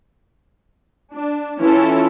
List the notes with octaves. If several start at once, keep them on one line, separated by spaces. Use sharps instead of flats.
D4
E3 C#4 E4 F4 A4